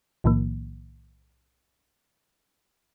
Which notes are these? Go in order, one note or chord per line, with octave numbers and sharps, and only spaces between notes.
B1 A2 D#3 F3 A#3